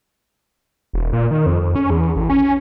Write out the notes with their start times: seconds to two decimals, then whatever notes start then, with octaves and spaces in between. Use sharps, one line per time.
0.93 E1
1.13 A#2
1.31 D#3
1.46 F2
1.61 F2
1.76 C#4
1.90 E2
2.16 A1
2.30 C#4